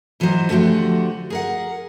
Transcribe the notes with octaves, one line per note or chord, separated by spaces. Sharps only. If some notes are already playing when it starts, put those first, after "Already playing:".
G#2 E3 F#3 A4 C5 D#5
D3 F3 A3 F#4 G4
G#4 A#4 F#5